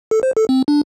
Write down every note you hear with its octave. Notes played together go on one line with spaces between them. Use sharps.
A4
C5
A4
C4
D4